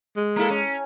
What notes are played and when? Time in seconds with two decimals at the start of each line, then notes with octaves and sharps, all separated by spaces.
0.17 G#3
0.36 A#3 E4 A4
0.50 C#4